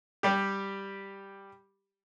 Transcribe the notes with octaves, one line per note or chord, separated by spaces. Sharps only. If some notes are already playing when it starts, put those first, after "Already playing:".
G3 G4